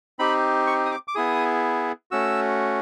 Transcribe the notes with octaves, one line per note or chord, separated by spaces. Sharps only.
C4 D#4 G4 B5
C#6
D#6
D6
D6
B3 E4 G#4 D#6
A3 C#4 F#4 E6